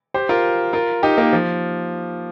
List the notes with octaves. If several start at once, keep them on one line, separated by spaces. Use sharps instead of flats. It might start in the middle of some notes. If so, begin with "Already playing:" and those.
G4 C5
F4 A#4
F4 A#4
D#4 G4
A#3 D#4
F3